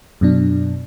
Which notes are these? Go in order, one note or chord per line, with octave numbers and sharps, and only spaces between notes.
F#2 B2 D4